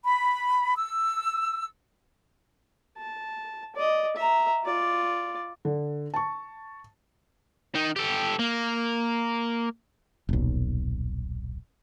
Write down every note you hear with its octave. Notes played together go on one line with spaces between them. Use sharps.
B5
E6
A5
D5 D#5
E5 A#5
F4 D5
D3
A5 C#6
D#3 D#4
G4 A4
A#3
D#1 B1